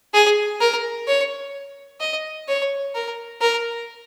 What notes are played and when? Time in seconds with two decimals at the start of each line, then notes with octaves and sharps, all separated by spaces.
0.13 G#4
0.60 A#4
1.07 C#5
2.00 D#5
2.48 C#5
2.95 A#4
3.41 A#4